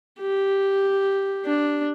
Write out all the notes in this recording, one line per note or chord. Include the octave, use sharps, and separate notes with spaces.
G4
D4